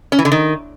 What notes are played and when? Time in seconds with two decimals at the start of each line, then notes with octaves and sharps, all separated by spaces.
0.12 C#4
0.19 E3
0.25 D3
0.32 D#3